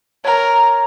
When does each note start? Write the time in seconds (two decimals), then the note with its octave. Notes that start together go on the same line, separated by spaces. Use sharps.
0.25 A#4 C#5 A#5